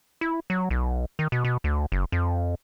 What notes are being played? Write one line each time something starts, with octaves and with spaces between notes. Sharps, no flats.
E4
F#3
B1
D#3
B2
B2
D2
F#1
F2